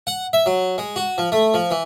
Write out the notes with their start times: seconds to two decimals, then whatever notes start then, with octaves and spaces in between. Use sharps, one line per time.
0.07 F#5
0.33 E5
0.46 F#3
0.78 G#3
0.96 F#4
1.18 F3
1.32 A3
1.54 F3
1.71 E3